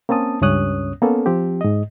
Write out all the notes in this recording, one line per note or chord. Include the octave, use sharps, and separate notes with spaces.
A#3 C4 C#4 A5 D#6
C#2 G2 C#4 C#5 D#6 F#6
A#3 B3 C#4 A4
F3 C4 G4
G#2 D#5